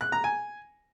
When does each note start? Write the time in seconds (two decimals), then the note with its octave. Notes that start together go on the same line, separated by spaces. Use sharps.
0.01 F#6
0.12 A#5
0.24 G#5